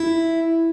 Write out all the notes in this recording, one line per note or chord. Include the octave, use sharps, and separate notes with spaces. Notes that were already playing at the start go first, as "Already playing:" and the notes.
Already playing: E4